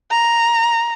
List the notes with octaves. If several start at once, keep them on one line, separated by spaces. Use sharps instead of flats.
A#5